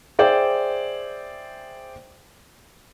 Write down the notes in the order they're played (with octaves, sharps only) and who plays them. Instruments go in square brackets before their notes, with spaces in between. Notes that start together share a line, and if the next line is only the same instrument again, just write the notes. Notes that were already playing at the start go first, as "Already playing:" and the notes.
[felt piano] G#4 C5 D5 E5 G5